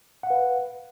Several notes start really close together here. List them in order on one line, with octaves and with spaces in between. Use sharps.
F#5 F5 B4